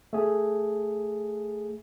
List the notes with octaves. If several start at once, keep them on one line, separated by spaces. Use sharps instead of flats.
A3 G#4